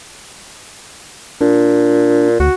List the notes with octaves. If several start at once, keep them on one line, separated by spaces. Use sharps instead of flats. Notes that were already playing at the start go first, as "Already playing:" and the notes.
A#2 D4
D2 F#4